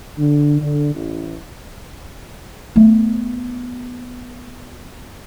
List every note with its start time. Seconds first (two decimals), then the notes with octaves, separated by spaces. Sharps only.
0.19 D3
0.61 D3
0.95 A1
2.76 A3 B3